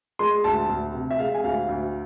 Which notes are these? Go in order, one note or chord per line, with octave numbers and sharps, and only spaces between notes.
G#3 C6
D2 A5
D2
C3
E5
G#3 F5
G#5
D2 F5
D2